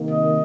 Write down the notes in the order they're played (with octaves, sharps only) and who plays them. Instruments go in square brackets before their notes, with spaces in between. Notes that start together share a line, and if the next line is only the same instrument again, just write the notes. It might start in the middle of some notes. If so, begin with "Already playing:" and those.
Already playing: [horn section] C3 D#3 A#3
D#5